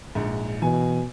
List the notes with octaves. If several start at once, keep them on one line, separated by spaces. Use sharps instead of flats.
A#1 G#2
B2 E3 G#5